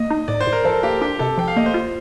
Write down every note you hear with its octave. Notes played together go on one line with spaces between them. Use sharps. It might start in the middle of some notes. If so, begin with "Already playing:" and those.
Already playing: A#3 D#5
D#4
A2 D5
C5
A2
A#4
F3 A4
A#3 G4
D4 G4
C3 A4
F3 G5
F5
A#3 D#5
C5
F4